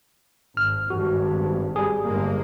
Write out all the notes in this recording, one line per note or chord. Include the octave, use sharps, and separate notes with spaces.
G#1 F6
G#1 G2 F#4
G3 G#4
G1 G#3 A#3